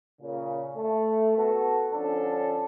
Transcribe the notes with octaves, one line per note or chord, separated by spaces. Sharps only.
A#2 C#3
A3
B3 F#4 A4
D3 F3 C#4 D4 A4